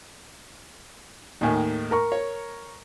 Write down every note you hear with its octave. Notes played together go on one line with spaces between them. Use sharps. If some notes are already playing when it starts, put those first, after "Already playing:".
D#2 A2 D#3 D#4 G#5
A#4 A#5 C#6
C#5